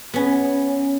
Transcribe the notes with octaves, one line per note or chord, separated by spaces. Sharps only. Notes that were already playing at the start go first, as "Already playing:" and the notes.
B3 C#4